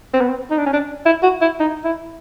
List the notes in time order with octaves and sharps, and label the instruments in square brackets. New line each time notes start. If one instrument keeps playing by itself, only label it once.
[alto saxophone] C4
B3
C4
D#4
D4
C#4
D4
E4
F#4
E4
D#4
E4